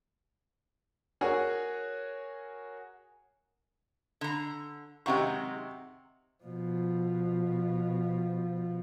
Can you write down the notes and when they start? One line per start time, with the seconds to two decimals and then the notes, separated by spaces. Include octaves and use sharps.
1.21 F#4 G#4 A#4 C#5 G#5
4.21 D3 A#5
5.06 C3 D#3 F#3 G#3 F#5 C#6
6.43 B2 F3